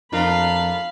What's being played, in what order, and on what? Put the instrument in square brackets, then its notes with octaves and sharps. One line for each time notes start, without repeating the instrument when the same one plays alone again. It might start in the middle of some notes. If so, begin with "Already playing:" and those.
[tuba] F2 [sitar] D4 F4 A#4 [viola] F5 B5